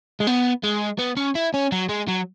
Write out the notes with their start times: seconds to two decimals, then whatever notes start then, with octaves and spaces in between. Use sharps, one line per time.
0.20 G#3
0.27 B3
0.63 G#3
0.99 B3
1.17 C#4
1.35 E4
1.54 C#4
1.72 F#3
1.89 G#3
2.08 F#3